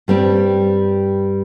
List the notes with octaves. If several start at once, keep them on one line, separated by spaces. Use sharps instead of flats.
G2 G3 C4